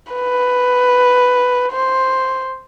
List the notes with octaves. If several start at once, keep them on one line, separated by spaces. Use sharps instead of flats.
B4
C5